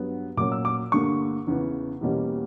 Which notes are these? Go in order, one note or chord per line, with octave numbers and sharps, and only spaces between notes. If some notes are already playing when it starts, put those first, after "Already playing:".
Already playing: G2 F#3 B3
A#2 F#3 A#3 C#4 D6
E6
D6
G2 D3 A#3 C#6
E2 C#3 E3 B3
E2 B2 G3 A#3 C#4